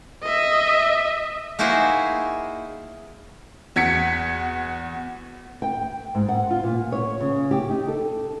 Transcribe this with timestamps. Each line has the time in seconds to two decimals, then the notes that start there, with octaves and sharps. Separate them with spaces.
0.23 D#5 E5
1.59 A#3 D#4 E4 F#4 G#4 C5
3.76 E2 F#4 G#6 B6 C#7
5.62 G5
6.15 G#2
6.29 F#5
6.51 F4
6.63 A#2
6.92 C#5
7.21 C#3
7.51 G4
7.70 D#4
7.88 A4